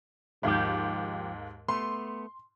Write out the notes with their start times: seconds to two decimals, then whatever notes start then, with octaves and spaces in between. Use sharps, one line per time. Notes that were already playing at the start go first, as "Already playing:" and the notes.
0.43 D#2 G#2 F3 G4
1.68 A3 B3 C6